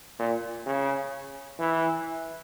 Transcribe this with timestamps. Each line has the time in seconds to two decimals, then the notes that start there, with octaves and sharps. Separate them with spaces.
0.19 A#2
0.66 C#3
1.59 E3